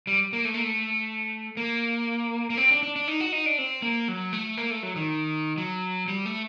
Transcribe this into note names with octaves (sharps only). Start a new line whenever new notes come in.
G3
A#3
A3
A#3
A3
A#3
A#3
C4
D4
D4
D4
D#4
F#4
D#4
D4
C4
A#3
F#3
A3
A#3
A3
F#3
D#3
F#3
G3
A3